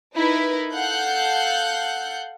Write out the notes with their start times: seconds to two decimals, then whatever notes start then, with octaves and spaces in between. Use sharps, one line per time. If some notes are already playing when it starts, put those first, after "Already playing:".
0.15 D#4 E4 A#4 B4
0.73 A4 F5 F#5 F#6 G6